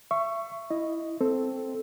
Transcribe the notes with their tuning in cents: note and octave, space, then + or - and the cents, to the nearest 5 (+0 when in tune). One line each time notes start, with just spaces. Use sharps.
E5 +30 C#6 +0
E4 +0 D#5 +0
C4 +0 A4 +0